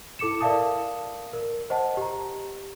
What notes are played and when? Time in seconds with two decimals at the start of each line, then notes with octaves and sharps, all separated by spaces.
0.19 E4 A4 D6 C#7 E7
0.41 A#4 D5 E5 F5 A5 D#6
1.33 A#4
1.70 C5 D#5 F#5 A5
1.97 G4 A#5